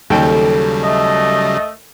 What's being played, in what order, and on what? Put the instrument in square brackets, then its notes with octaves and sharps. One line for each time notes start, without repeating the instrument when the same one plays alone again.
[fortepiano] D#2 G5 [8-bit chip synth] C#3 F#3 G3 [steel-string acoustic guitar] A4
[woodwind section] A3 D#5